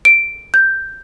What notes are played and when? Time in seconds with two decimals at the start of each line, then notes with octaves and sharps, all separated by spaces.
0.05 D7
0.54 G6